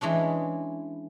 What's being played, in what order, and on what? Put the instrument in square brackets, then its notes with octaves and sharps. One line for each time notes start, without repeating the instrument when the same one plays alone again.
[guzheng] E3 G#3 C#4 D4